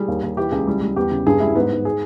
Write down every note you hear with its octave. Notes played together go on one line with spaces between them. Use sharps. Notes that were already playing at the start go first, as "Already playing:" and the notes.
Already playing: G3 G#4
D#2
D#2
E3 G4
C#2 G#4
G3
G3
E2 G4
C#3
G2 G#4
G3 E4
G#2 B3
G#2
G#4